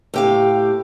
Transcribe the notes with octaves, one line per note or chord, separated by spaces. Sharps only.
A2 G4 F5